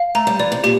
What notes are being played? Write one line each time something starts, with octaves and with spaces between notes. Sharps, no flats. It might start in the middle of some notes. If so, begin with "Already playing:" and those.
Already playing: F5
A3 A#5
G3
E3 D5
C3
A#2 G4